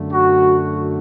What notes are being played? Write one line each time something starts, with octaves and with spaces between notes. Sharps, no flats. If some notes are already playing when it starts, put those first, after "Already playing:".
Already playing: F#2 D3 A3
F#4